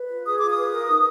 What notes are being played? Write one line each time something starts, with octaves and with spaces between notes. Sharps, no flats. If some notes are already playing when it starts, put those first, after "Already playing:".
Already playing: B4
F4
G#4 D#6
F4 D6
D#6
B4
A#4
D#4